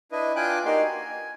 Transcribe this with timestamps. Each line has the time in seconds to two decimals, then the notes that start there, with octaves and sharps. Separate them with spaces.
0.12 D4 E4 B4 D#5
0.36 D4 F4 G5 G#5 D6 F#6
0.65 A#3 D#4 F#4 G4 C6
0.82 G#5